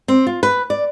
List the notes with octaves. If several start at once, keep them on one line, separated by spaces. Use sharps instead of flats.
C4
F4
B4
D5